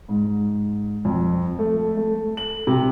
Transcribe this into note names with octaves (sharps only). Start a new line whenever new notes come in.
G#2
F2
A3
A3
F#7
C3